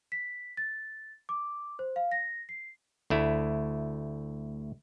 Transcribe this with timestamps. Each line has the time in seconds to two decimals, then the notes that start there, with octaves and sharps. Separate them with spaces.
0.12 B6
0.57 A6
1.29 D6
1.79 C5
1.96 F5
2.12 A#6
2.49 C7
3.10 D2 A3 E4